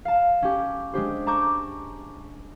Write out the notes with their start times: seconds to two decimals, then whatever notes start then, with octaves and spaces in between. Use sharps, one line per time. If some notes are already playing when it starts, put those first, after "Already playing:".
0.05 F5 A5
0.42 C#4 G4
0.94 G#3 D4 G4 C5
1.26 A5 A#5 C#6 D6 G6